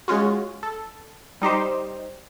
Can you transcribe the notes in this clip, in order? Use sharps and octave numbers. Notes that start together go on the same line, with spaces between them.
G#3 C#4 F4 F#4
A4
G3 D#4 G4 C5